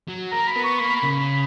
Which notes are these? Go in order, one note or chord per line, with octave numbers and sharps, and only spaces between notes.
F#3
A#3 A#5
B5
B3
C#6
A#3 B5
B5
C#3
B5